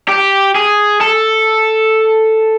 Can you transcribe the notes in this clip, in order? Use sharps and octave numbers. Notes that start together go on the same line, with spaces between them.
G4
G#4
A4